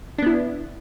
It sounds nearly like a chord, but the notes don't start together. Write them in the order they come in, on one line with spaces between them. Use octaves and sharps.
D4 B3 E4